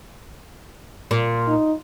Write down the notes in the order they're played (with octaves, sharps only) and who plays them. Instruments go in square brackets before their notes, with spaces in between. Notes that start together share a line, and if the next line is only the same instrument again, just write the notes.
[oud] A#2
[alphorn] D#4